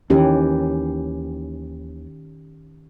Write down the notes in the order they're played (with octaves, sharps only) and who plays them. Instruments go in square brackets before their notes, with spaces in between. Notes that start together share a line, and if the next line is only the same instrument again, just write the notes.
[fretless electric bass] D#2 E3 [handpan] D#3 C#4 G4